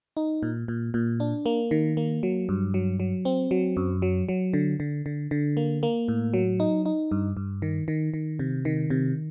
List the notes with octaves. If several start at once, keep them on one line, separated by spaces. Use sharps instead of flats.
D#4
A#2
A#2
A#2
D4
A#3
D#3
A#3
F#3
G2
F#3
F#3
C4
F#3
F#2
F#3
F#3
D3
D3
D3
D3
A#3
A#3
A2
F#3
D#4
D#4
G2
G2
D#3
D#3
D#3
C3
D#3
C3